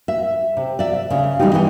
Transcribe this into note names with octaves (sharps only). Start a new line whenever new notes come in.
E5
C3
D5 E5
C#3
E3 G3 G#3 A#3 D#4 G4
E3 B3 D#4